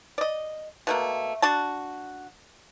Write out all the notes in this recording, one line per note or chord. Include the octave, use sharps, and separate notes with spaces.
D5 D#5
B2 A3 A#3
D4 F#4 A5